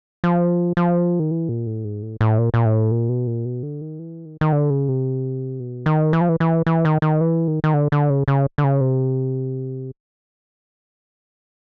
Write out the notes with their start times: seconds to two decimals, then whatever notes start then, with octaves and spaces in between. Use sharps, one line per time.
0.24 F3
0.77 F3
1.20 D#3
1.31 E3
1.49 A#2
1.67 A2
1.85 G#2
2.02 A2
2.21 A2
2.38 A#2
2.54 A#2
2.65 A2
2.91 A#2
3.09 B2
3.27 A#2
3.45 B2
3.63 D3
3.81 D#3
3.99 E3
4.25 D#3
4.41 D#3
4.52 D3
4.70 C#3
4.88 C3
5.60 B2
5.86 D#3
6.13 E3
6.21 F3
6.29 E3
6.40 E3
6.67 E3
6.85 D#3
7.02 D#3
7.21 E3
7.48 D#3
7.64 D#3
7.74 D3
7.92 D3
8.10 C#3
8.28 C#3
8.58 D3
8.64 C#3
8.81 C3